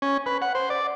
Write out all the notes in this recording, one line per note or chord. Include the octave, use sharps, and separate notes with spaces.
C#4
B4
F#5
C5
D5